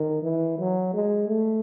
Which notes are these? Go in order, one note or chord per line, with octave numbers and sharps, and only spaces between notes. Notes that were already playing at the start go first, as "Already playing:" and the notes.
Already playing: D#3
E3
F#3
G#3
A3